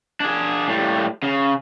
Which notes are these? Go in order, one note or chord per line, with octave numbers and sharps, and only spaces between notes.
D4 G#4
A2 G3
C#3